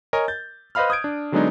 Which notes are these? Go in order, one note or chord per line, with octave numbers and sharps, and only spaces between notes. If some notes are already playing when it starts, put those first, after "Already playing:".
A#4 C#5 D#5 G#5
G6 A6
B4 C5 D#5 F5 B5 F6
D#6 G6 G#6 D7
D4
D3 F#3 G#3 B3 D4 D#4